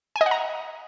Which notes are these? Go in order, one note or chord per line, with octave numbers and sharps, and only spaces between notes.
G#5
D#5
F#5
A#5